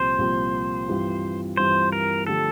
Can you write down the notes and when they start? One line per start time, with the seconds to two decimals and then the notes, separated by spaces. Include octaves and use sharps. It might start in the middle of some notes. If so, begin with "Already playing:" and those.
Already playing: C2 A#2 F3 C4 G4 C5
0.18 C2 A#2 F3 C4 G4
0.89 G2 E3 G3 C4 F4
1.57 G2 E3 G3 C4 F4 C5
1.92 A#4
2.27 D3 F3 A3 D4 G4 A4